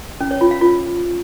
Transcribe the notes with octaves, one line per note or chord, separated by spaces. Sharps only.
C#4
C#5
F4
F5
F4